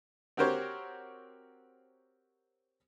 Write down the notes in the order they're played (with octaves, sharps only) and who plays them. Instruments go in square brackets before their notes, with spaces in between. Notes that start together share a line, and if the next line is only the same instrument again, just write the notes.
[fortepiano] C4 F#4 G4 A#4 C5 C#5